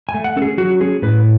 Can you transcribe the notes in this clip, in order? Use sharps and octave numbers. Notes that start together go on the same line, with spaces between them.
G#5
A3
F#5
C#4 A4
G#4
F#3 F#4
C#4 G#4
A2 B4